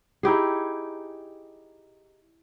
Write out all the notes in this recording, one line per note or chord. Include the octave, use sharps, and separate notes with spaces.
D#4 E4 G4 G#4